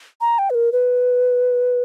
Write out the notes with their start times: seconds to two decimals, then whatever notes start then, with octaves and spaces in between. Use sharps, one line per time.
0.21 A#5
0.39 G5
0.50 B4
0.55 A#4
0.72 B4